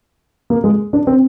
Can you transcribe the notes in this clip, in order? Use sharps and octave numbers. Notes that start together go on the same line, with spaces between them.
A#3
G#3
D4
C4